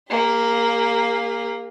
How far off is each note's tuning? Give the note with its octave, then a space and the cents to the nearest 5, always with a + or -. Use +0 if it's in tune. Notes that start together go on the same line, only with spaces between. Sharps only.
A#3 +0 G#4 -45